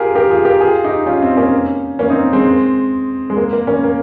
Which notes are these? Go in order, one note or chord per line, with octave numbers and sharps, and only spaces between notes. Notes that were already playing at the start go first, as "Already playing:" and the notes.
Already playing: F4 G4 G#4 A#4
G4 A#4
F4 G#4
G4 A#4
F4 G#4
D#4 G4
C#4 F4
C4 D#4
A#3 C#4
A#3 C#4
C4 D#4
G#3 C4
G#3
A#3
A#3
A#3 C#4
A#3